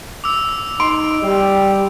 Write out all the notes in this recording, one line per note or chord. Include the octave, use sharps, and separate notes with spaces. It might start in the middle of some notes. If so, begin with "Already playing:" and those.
D6 E6
D#4 C6 D7
G3 G4